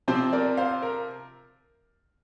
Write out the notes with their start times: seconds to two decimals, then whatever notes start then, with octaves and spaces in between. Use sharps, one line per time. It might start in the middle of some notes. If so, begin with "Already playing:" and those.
0.08 C3 F3 C4 C5
0.33 A#4 D5
0.57 C5 F5
0.82 A#4